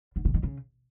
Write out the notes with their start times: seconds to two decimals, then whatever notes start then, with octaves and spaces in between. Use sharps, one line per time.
0.16 D3
0.25 C#3
0.34 D#3
0.43 C#3